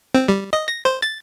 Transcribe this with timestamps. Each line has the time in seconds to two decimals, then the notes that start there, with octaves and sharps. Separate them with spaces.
0.14 C4
0.28 G3
0.53 D#5
0.68 A#6
0.85 C5
1.02 A6